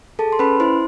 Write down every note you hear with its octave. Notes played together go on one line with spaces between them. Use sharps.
G#4 A4 A5
C6
C#4 B4 B5
E4 C5 C6